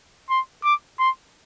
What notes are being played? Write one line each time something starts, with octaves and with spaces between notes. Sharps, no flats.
C6
D6
C6